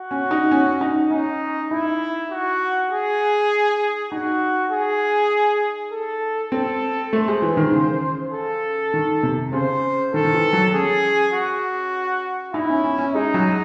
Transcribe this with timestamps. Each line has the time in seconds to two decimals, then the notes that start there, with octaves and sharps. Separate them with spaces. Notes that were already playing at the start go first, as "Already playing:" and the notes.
Already playing: F#4
0.11 C#4
0.31 D#4
0.51 C#4
0.81 D#4
1.11 C#4 D#4
1.71 D#4 E4
2.31 F#4
2.91 G#4
4.11 D#4 F#4
4.72 G#4
5.92 A4
6.52 C4 A4
7.13 A3 C5
7.28 G#3
7.42 E3
7.57 D#3
7.72 C#3
8.33 A4
8.94 D#3
9.23 C3
9.53 C#3 C5
10.13 D#3 A4
10.25 D#3
10.33 E3
10.53 F#3
10.74 C#4 G#4
11.33 F#4
12.53 D#4 E4
12.70 C#4
12.84 C#4
12.98 C#4
13.14 G#3 D#4
13.34 F#3